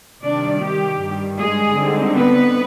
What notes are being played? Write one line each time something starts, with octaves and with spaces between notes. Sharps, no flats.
C3 D#3 G3 D4 D5
G4
G2 D#3 G3
G#3 G#4
D3 G3 C4 D#4
B3 B4